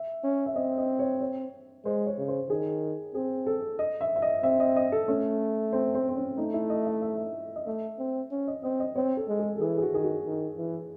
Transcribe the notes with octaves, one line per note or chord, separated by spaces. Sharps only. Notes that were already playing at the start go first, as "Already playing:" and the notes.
Already playing: E5
C#4
E5
C4 D#5
D#5
C#5
C#5
G#3 C5
C#5
C#3
C5
D#3 G#4
C4 G#4
A4
D#5
E5
E5
D#5
C4 E5
D#5
D#5
A4
A3 C#4
C4
C4
C4
C#4
A3 D#4
E4
D#5
E5
E5
D#5
A3 E5
C4
C#4
D#5
C4 D#5
D#5
C4 C#5
A4
G#3
G#4
A4
E3 G#4
G#4
F#4
D#3 G#4
F#4
D#3
E3